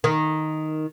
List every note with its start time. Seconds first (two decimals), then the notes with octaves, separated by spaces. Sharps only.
0.04 D#3